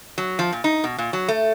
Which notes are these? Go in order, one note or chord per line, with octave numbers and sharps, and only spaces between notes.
F#3
F3
A#2
D#4
B2
A#2
F#3
A3